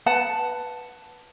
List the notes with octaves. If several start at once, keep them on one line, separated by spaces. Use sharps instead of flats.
B4 F#5 A5